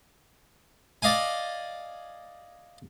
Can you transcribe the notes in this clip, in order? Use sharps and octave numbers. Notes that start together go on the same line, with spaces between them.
D5 D#5 F5 G#5